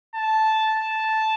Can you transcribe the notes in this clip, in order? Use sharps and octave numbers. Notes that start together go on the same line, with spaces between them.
A5
A5